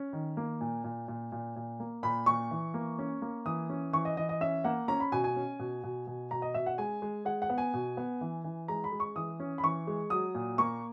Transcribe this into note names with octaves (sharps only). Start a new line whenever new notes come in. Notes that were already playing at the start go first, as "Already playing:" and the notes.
Already playing: C#4
D#3
A#3
A#2
A#2
A#2
A#2
A#2
A#3
A#2 B5
A#2 C#6
E3
A#3
C#4
A#3
E3 D#6
C#4
E3 C#6
D#5
E3 D#5
D#5
C#4 E5
A#3 F#5
C#4 A#5
B5
B2 G#5
G#5
C#4
B2
B2
B2
B2 A#5
D#5
B2 E5
F#5
G#3 G#5
G#3
G#3 F#5
F#5
B3
G#5
B2
B3
E3
E3
G#3 A#5
B5
G#3
C#6
E3 D#6
C#4
B5
E3 C#6
G#3
F#3 D#6
A#2
A#3 C#6